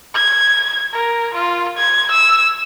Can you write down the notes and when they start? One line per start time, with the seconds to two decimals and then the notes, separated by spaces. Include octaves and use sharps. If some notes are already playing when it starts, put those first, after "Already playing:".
0.15 G#6
0.93 A#4
1.34 F4
1.78 G#6
2.11 E6